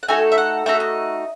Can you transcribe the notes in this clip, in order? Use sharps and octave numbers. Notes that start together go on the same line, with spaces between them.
F#5
A3 D#4 F#4 A4 G#5
E5
F#5
A3 D#4 F#4 A4 E5
D#5